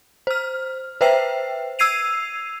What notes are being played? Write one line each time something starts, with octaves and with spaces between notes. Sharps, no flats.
C5 F6
B4 C5 E5 G5 C7
E6 G#6 C7 D#7 F7